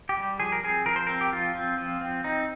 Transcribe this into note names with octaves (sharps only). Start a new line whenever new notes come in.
G4
G3
F3 G#4
A#4
C4 G#4
F3 A#4
C5
C4 A#4
G4
F3 F4
C4
F3
C4
C4 D#4